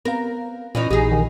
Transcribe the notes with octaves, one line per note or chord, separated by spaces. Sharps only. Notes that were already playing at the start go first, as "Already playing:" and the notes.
B3 C4 A#4 F5
A#2 E3 C#4 D#4
A#1 A#2 E3 D#4 G4 G#4
D#3